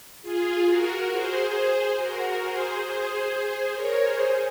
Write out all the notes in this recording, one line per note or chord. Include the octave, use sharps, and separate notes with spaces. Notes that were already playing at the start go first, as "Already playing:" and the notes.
F4 G#4
F#4 A#4
G#4 C5
F#4 A#4
G#4 C5
G#4 C5
A#4 C#5
G#4 C5